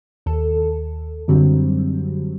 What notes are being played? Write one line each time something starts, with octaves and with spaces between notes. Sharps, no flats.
D#2 A4
F#2 D3 F#3 G3 C4